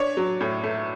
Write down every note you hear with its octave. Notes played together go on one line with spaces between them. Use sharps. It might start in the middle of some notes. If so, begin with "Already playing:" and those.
Already playing: D4 C#5
F#3
A2
A3